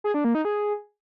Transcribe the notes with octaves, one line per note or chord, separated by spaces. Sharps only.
G#4
D4
A#3
D#4
G#4